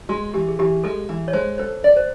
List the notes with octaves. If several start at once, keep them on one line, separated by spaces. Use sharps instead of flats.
G#3 F#4
E3 G4
G#4
E3 G4
G#3 A4
E3
C#5
G#3 C5
A4 C5
D5
C5